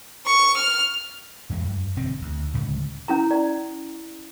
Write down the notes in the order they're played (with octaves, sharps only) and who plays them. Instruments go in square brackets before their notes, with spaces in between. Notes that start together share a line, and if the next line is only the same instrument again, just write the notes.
[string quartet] C#6
F6
[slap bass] E2 G#3
F#2
E1 D3 C4
D2
D1 C#2 A2
[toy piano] C#4 E4 A#5
D5